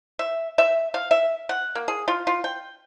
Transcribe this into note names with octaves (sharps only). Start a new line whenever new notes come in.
E5
E5
F5
E5
F#5
A#3
G#4
F4
F4
G5